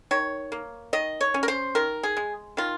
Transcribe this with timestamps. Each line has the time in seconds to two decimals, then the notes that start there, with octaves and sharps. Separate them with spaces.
0.11 D#3 C#5
0.52 A#3
0.93 D#3 D#5
1.21 C#5
1.34 C#4
1.43 A#4
1.48 C5
1.75 D#3 A#4
2.03 G#4
2.17 G#3
2.57 D#3 F4